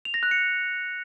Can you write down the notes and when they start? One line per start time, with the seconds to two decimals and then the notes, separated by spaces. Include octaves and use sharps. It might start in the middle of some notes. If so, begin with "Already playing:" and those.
0.05 F7
0.14 A#6
0.23 F#6
0.31 C#7